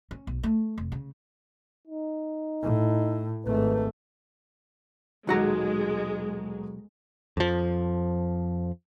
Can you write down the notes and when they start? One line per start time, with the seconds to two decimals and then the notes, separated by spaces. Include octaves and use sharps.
0.11 C#4
0.27 B1
0.43 A3
0.78 F1
0.92 C#3
1.87 D#4
2.62 A2
3.46 G#1 A3 B4
5.27 D#1 B1 D#3 F#3 G#3 F#4 A#5
7.37 F2 F3